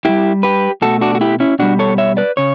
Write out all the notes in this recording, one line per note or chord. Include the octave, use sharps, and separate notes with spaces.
A2 G3 E4 G4
G4 B4
B2 A3 F#4 A4
D4 F#4
F#4
E4 G4
C#4 E4
B2 G3 D4 F#4
A4 C#5
C#5 E5
B4 D5
C#3 C#5